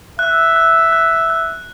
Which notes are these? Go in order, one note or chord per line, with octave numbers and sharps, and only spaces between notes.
E5 F#6
F#6
F#6
F#6